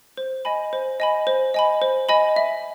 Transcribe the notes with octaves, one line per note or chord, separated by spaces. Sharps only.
C5
D#5 G#5 B5
C5
D#5 G#5 B5
C5
D#5 G#5 B5
C5
D#5 G#5 B5
E5